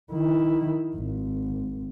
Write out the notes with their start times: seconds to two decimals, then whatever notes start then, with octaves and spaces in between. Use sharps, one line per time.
0.12 D#3 E4
0.96 G#1